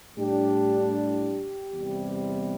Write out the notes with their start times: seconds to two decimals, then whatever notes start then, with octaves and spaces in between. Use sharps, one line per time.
0.17 A2 G3 D4 G4
0.96 G4
1.74 E2 C3 G3